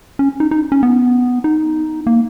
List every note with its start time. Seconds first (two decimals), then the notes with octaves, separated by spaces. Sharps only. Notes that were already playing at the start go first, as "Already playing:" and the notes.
0.19 C#4
0.40 D#4
0.51 D#4
0.72 C#4
0.83 B3
1.44 D#4
2.07 A#3